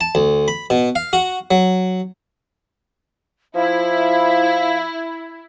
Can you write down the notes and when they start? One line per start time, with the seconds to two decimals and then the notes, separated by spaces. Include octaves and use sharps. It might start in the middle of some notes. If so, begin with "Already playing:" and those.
0.01 A5
0.15 D2
0.48 B5
0.70 B2
0.95 F5
1.13 F#4
1.51 F#3
3.55 F3 E4 F5